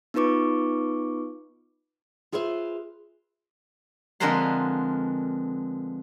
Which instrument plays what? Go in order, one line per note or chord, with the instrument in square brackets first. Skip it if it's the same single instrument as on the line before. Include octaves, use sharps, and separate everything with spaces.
[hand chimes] B3 D#4 F4 B4 C#6 D6
[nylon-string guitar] F4 G#4 B4 C5 E5
[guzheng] F2 D3 G#3 A#4 B4 C6